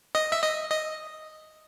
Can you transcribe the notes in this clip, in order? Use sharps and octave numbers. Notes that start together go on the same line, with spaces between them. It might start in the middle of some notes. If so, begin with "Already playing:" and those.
D#5
E5
D#5
D#5